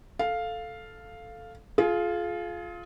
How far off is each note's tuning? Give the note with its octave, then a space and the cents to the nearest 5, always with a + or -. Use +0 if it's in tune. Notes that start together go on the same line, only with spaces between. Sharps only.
A4 +0 F5 +0
F4 +0 G#4 +35